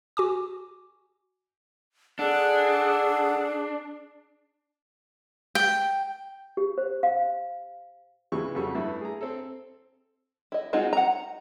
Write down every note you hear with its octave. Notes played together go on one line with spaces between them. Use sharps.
F#4 G#5 D6
D4 G#4 A4 F#5
G5
G4
C5
F5
D2 C#3 E3 G3 G#3 C#6
F2 C#3 F#3 G3 A4 C#6
G2 A3 E4
G#4 A#5
C4 A4
E4 D#5
G#3 C4 D#4 F4 F#4
F#5 A#5